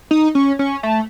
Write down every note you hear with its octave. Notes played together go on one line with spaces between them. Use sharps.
D#4
C#4
C#4
A3